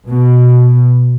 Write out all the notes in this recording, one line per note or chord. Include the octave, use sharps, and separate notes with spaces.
B2